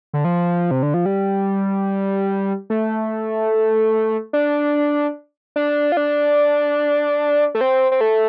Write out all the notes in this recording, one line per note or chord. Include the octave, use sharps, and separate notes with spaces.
D3
F3
C3
D3
F3
G3
A3
D4
D4
F4
D4
A3
C4
C4
A3